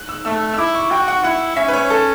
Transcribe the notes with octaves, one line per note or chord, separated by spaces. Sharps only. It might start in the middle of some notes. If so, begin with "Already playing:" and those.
Already playing: F#6
E6
A3 E6
E6
E4 D6
C#6
F#4 G5
F#5
E4 F#5
C#4 E5
B4
C#5
A4